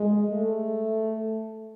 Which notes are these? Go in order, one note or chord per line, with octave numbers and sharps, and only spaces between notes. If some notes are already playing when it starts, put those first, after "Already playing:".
Already playing: G#3
A3